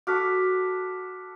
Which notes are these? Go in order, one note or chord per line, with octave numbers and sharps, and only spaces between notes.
F#4 A4 D6 F6 B6